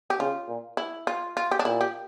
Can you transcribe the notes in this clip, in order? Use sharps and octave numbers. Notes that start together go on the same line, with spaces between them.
G4
C#3 F4
A#2
E4
F4
F4
G4
D4
A#2 E4
G4